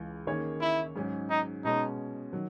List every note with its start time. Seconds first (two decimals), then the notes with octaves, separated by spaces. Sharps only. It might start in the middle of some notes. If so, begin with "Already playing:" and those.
Already playing: C#2 C#3 E3
0.27 D#3 A#3 C#4 G#4 C#5
0.61 E4
0.96 G#2 F#3 C#4 G#4
1.30 D#4
1.64 B2 G#3 C#4 D#4
2.33 D#3 F#3